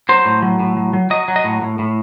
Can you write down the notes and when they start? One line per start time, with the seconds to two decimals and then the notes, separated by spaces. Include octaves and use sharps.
0.09 F#3 C5
0.25 A2
0.42 F#3
0.60 A2
0.77 F#3
0.93 F#3
1.10 F#3 D#5
1.28 F#3
1.36 D#5
1.44 A2
1.61 A2
1.79 A2